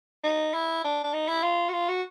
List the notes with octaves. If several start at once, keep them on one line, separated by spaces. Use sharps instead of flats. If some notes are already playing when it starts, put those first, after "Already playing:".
D#4
E4
D4
D4
D#4
E4
F4
F#4
F4
F#4